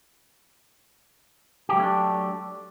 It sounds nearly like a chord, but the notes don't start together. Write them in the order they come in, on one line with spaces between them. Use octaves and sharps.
G4 F#3 A3 C#4 D4